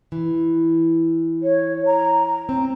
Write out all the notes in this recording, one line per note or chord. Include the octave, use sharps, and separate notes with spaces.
E3
C#5
A#5
C4